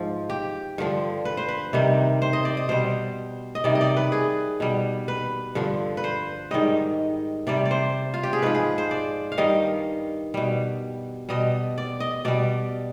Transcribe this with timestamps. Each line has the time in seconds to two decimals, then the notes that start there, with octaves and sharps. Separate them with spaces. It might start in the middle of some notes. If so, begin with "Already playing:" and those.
Already playing: G#2 F3
0.30 G4
0.78 G2 D3 F3
1.25 B4
1.37 C5
1.49 B4
1.73 C3 D#3 G3
2.22 C5
2.33 D#5
2.45 D5
2.57 D#5
2.69 B2 G3 C5
3.55 D#5
3.64 C3 D#3 G3 D5
3.75 D#5
3.81 D5
3.97 B4
4.12 G#4
4.60 B2 G3
5.08 B4
5.55 G2 D3 F3
5.97 B4
6.04 C5
6.51 G#2 D#3 G3 D#5
7.47 C3 G3 D5
7.66 D5
7.71 C5
8.14 F4
8.23 G4
8.33 G#4
8.42 G#2 F3 B4
8.55 G#4
8.78 C5
8.91 D5
9.32 F5
9.38 G2 D#3 G3 D#5
10.34 B2 G3
11.29 B2 G3 D#5
11.78 D5
12.00 D#5
12.25 B2 G3 D5